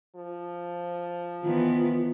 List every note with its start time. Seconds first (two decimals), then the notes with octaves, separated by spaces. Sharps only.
0.16 F3
1.43 D#3 E3 B3 F4